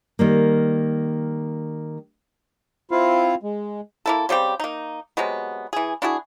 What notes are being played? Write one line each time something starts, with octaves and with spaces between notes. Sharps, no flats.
D#3 G3 A#3
C4 E4 F4 F5
G#3
A#3 E4 A4
C#3 G3 C4 G4
A#3 D#4
C3 F#3 G#3 B3
E3 G#4
D4 E4 F#4 G#4